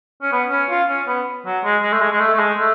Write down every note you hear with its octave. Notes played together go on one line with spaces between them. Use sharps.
C#4
B3
C#4
F4
C#4
B3
F#3
G#3
G#3
A3
G#3
G#3
A3
A3
G#3
A3